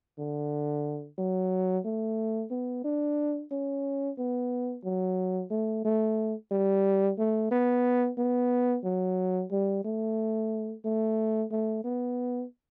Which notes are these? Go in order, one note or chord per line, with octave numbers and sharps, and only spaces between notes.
D3
F#3
A3
B3
D4
C#4
B3
F#3
A3
A3
G3
A3
B3
B3
F#3
G3
A3
A3
A3
B3